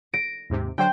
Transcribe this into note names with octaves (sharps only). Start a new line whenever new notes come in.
A#6 D7
D#2 G#2 C3
D3 F#3 C5 G5